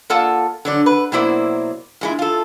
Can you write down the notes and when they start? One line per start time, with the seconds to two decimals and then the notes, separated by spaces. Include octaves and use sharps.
0.10 A#3 F4 A4 D5 F#5 A5
0.65 D3 F#3 D5
0.86 B4
1.12 B2 F#3 A#3 E4 C5 D5
2.01 A#2 G#3 E4
2.19 F4 A4